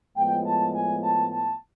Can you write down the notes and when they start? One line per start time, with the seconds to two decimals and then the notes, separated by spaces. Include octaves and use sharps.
0.16 A2 F3 G#3 B3 G5
0.45 A5
0.74 G#5
1.03 A5
1.31 A5